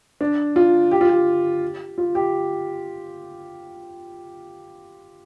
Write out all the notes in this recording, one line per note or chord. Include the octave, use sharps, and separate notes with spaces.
D4
F4
G4
F4
G4
F4
G4